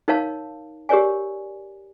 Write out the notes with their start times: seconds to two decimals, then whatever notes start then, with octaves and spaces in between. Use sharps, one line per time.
0.08 D#4 A#4 C#5 F5 A5
0.89 G4 A#4 C#5 D5 G#5